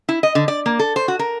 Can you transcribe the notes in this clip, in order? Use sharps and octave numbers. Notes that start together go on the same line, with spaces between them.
E4
D#5
D3
D5
A#3
A4
C5
F#4
A#4